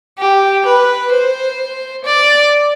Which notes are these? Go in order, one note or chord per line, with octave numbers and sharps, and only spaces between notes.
G4
B4
C5
D5